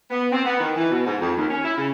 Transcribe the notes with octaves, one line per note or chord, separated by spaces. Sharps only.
B3
C4
B3
D#3
E3
B2
G#2
F2
D#2
C#4
E4
C#3